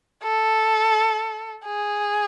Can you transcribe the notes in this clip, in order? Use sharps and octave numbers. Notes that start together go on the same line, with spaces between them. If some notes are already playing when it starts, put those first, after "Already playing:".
A4
G#4